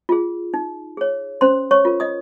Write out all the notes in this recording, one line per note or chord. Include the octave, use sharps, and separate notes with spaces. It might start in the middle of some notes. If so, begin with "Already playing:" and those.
F4 G#4
D#4
G#4 C#5
C#4 C5 C6
C#5 C#6
F4 A#4
D#5 D#6